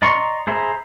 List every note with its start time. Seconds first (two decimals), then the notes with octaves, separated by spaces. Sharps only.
0.02 D5 D#5 A#5 C6 C#6
0.47 G#4 C5 E5 A#5 B5